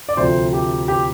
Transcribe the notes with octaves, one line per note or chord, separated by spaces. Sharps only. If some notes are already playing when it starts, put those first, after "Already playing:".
D5
D2 C3 F3 C5
G4
G4